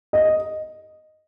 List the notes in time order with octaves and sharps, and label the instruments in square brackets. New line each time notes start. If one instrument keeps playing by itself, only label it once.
[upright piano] D#5